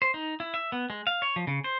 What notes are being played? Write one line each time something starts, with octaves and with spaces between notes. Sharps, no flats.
C5
D#4
E4
E5
B3
G#3
F5
C#5
F3
C#3
C5